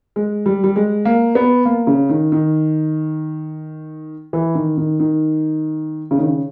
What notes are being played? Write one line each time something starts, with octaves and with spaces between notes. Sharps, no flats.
G#3
G3
G3
G#3
A#3
B3
A#3
C#3
D#3
D#3
E3
D#3
D#3
D#3
C#3
D#3
C#3